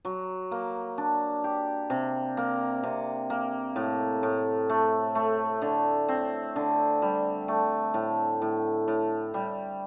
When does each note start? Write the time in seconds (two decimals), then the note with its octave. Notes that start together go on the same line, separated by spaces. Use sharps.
0.05 F#3
0.51 A#3
0.98 D4
1.44 G4
1.90 C3
2.37 A#3
2.83 C3
3.30 A#3
3.76 A2
4.23 A2
4.69 A3
5.15 A3
5.62 D3
6.09 C4
6.56 D3
7.02 G3
7.48 A3
7.94 A2
8.42 A2
8.88 A2
9.34 G3